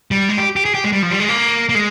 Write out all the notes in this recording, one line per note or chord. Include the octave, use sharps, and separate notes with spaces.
G3
G#3
G4
G4
G#4
G4
G#3
G3
F3
G3
G#3
A#3
A#3
G#3